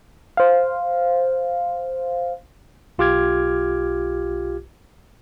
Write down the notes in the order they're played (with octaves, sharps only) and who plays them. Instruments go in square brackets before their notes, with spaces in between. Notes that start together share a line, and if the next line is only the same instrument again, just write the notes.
[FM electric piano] C5 F5
[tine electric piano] B1 F4 G4 D6 F6 G#6